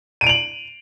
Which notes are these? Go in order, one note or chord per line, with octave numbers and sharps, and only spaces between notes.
D7 D#7 F7 F#7